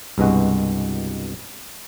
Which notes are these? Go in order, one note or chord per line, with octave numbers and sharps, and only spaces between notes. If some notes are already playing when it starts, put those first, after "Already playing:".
C2 G2 B2 G#3 F#4